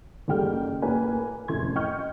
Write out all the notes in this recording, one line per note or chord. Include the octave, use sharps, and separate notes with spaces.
F#1 C#3 G3 A4 G5 F6
A2 A#3 B4 G#5
F1 F#2 A2 C6 G#6
D#5 G5 C#6 F6 G6